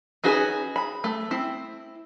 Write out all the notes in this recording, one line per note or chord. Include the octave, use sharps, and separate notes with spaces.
C#4 D#4 F#4 G#4 B4
B5
A3
C4 E4